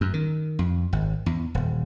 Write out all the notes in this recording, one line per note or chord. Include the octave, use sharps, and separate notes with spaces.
F#2
D#3
F2
G#1
E2
D#1